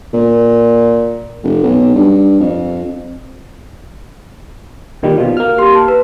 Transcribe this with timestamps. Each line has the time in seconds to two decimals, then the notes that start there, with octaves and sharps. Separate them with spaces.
0.14 A#2
1.44 F1
1.64 B1
1.95 G2
2.40 F2
5.03 A#2 D#3 G3
5.18 B2 F3
5.37 A#3 F6
5.58 G4 C6
5.75 A5
5.88 B4